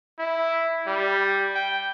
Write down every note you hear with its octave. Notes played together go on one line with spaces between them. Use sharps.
E4
G3
G5